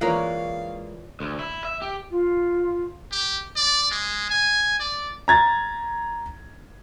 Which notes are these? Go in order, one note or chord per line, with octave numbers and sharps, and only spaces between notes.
E3 G#3 A#3 F4 A#4 C#5 D5 F5
D2
E4
E5
G4
F4
G4
D5
G#3
G#5
D5
A#5 G#6 A6